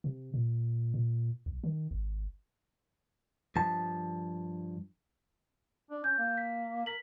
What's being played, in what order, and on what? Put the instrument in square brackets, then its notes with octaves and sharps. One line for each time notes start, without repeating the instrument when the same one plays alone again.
[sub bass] C3
A#2
A#2
B1
D#3
G#1
[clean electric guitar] G2 F3 A5
[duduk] D4
[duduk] C#4 [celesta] G6
[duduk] A#3
[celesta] B6
[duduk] A#4 [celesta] B6 F#7